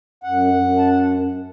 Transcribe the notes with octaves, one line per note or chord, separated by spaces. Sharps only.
F#2 F#5
F#2
A5